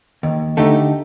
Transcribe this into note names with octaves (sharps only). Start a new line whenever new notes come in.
D#2
D3 A3 D#4 G4